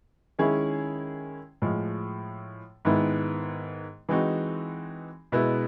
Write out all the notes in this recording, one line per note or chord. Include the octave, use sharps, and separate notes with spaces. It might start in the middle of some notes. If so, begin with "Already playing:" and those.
D#3 G#3 C#4 E4 G#4
A2 F3 G#3
G#2 D#3 G#3 B3 E4
E3 G#3 C4 D#4 F#4
B2 G#3 B3 E4